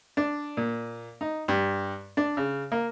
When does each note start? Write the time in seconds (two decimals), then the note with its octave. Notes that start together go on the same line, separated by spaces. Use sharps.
0.17 D4
0.57 A#2
1.21 D#4
1.48 G2
2.17 D4
2.37 C#3
2.72 A#3